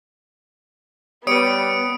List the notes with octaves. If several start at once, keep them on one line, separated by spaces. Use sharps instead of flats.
G3 B3 B4 C#5 D#6 C#7 D7